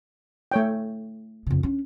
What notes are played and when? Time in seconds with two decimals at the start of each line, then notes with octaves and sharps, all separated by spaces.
0.52 A3 C#5 G5
1.47 F2 C#3
1.63 C#4 D4